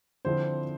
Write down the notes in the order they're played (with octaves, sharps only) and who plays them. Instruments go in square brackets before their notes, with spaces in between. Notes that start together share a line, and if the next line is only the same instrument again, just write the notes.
[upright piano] D3 F3 C4 E4 C5